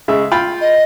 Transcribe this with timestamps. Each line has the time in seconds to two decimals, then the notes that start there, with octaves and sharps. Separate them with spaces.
0.08 C#3 G#3 E5
0.32 F4 G5 B5
0.61 D#5